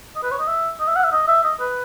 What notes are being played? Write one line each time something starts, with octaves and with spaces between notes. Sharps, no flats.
D#5
B4
C#5
D#5
E5
D#5
E5
F#5
E5
D#5
E5
D#5
B4